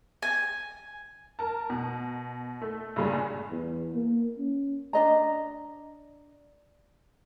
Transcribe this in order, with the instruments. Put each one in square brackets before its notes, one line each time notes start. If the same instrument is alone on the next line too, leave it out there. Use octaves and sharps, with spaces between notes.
[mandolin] G#5
[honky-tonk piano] A#4 A5
B2
A3
G2 A#2 C#3 G3 G#3
[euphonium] E2
A#3
C#4
[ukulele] D4 D#5 A#5